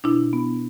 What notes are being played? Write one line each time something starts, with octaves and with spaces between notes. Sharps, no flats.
B2 D4 E4
B3